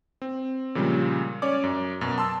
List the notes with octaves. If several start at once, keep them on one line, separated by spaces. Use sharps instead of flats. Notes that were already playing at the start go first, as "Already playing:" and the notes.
C4
A#2 C#3 F3 G3 G#3
C#4 C#5 D5 D6
F#2
F#2 B2
A5 C6 E6